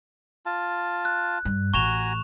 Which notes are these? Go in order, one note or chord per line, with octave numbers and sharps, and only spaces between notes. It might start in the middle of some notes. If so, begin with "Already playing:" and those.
F4 A5
F#6
G2
A1 F#4 G#5 A#5 C#6 E7 F7